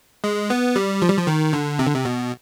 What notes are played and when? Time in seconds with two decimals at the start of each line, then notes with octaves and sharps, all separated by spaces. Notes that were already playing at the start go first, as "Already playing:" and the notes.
0.24 G#3
0.50 B3
0.76 G3
1.02 F3
1.09 G3
1.18 F3
1.27 D#3
1.53 D3
1.79 C3
1.87 D3
1.95 C3
2.05 B2